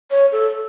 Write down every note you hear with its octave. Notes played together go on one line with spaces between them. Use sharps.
C#5
A4